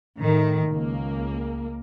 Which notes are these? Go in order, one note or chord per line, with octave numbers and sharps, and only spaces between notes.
A2 D#3
C#2 A#3